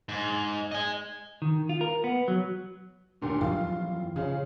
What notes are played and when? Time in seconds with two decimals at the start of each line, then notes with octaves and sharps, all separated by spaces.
0.09 G#2
0.72 D#5 G#5
1.42 D#3
1.69 F4
1.81 A#4
2.04 B3
2.28 F#3
3.22 D#2 A#2 D3
3.41 F#2 E3 F3 F4
4.16 C#3 C#4 F4 G#4